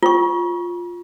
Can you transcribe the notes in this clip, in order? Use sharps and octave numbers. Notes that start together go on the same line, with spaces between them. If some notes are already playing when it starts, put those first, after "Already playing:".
F4 C#6